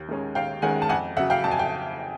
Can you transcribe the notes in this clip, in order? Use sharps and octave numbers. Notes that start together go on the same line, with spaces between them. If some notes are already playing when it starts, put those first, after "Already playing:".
Already playing: D#2
D#3 G#3 C#4
D#2 F5 G5
D#3 G#3 C#4 F#5 G#5
A5
F2 F#5 G#5
C#3 F#3 E5 F#5
F5 G5
F2 A5
G#5
G5